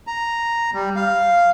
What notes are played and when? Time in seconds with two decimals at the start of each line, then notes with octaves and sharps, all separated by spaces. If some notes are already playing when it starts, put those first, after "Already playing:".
0.07 A#5
0.74 G3
0.96 F5